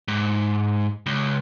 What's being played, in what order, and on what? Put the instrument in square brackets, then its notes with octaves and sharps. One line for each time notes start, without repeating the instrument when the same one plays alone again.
[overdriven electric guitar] G#2
C#2